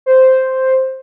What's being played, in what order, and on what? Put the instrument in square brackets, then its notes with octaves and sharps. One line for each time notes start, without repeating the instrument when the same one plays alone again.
[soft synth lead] C5